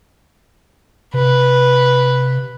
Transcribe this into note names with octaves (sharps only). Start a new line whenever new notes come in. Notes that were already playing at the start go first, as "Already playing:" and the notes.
C3 B4